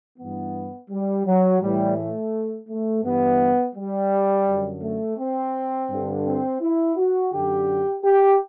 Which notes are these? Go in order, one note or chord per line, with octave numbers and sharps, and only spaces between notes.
G2 E3 B3
G3
F#3
A2 E3 G3
A3
A3
G2 E3 B3
G3
F#2 D3
A3
C4
G2 D3
C4
E4
F#4
F#2 D3 G4
G4